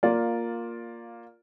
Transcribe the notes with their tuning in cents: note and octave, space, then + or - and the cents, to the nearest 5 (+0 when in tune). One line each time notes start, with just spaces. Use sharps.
A#3 +0 F4 +10 D5 -10